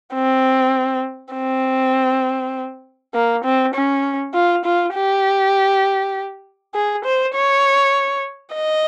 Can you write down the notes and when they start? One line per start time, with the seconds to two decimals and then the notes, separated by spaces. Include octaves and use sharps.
0.14 C4
1.34 C4
3.14 A#3
3.44 C4
3.74 C#4
4.34 F4
4.65 F4
4.94 G4
6.75 G#4
7.05 C5
7.35 C#5
8.55 D#5